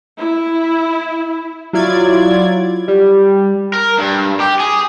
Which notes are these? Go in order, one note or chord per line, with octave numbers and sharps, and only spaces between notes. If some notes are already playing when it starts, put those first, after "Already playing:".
E4
F#3 E4 F4 D5 G#6
G3
A#4
G2
G4
G#4